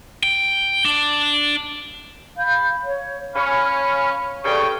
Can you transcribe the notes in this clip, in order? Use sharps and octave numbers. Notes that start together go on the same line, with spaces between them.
G5
D4
F5 B5 G6
C#5
C#4 F5 B5 F6
G2 C#3 A4 D5 G5 C#6